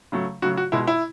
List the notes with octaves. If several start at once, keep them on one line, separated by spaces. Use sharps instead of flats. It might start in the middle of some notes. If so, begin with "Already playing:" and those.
C#3 F#3 A3
C#3 F#3 A3 F#4
F#4
B2 G#3 E4
E4